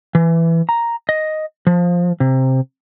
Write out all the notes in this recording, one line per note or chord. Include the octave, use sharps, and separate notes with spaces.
E3
A#5
D#5
F3
C3